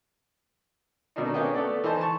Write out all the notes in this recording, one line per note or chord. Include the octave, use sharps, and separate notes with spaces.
B2 D#3 A3 D4 D#4
A#3 B3 C#4 D4 D#5 G5
A3 B3 A4 D5
E3 D#4 C5 A5
A5 C#6